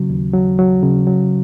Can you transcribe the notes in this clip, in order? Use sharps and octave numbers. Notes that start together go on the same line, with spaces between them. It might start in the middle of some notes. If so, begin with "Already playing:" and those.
Already playing: C#3 F#3
D#2
F#3
F#3
C#3
F#3